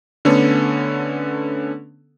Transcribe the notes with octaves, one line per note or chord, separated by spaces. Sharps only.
D3 A3 B3 C#4 A4